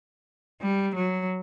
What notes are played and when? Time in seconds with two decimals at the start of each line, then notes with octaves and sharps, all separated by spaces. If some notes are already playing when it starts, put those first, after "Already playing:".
0.61 G3
0.95 F#3